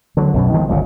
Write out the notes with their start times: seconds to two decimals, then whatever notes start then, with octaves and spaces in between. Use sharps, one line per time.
0.17 D3 F#3
0.34 B1 F#2 B2
0.54 D#3 F3 G#3
0.68 G1 C#2 A#2